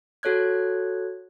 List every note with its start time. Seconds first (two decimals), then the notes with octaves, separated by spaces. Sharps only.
0.23 F#4 A4 C#5 F#6 G#6